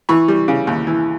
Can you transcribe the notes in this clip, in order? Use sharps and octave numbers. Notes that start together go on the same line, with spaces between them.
E3 B5 C#6
G3
C#3
D#2
E3